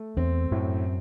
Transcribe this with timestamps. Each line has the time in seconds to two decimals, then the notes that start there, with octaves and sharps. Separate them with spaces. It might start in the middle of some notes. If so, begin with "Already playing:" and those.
Already playing: A3
0.17 E2 C4
0.51 F#2 A2